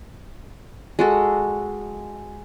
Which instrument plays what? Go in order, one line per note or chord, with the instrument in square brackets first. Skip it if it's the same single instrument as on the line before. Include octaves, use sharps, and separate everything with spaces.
[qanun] G#3 F#4 A4